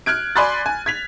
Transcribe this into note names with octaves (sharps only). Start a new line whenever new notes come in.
F6 F#6 G#6 D7
D5 G#5 B5 C6 F#6 A6
G#5
G#6 B6 F7